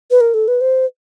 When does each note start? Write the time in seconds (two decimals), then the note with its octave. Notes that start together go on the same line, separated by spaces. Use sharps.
0.11 B4
0.21 A#4
0.34 A4
0.48 B4
0.61 C5